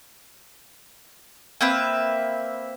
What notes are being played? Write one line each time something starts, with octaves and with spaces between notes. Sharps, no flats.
A#3 C4 B4 E5